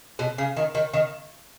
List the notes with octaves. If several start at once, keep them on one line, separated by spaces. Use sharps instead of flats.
B2
C#3
D#3
D#3
D#3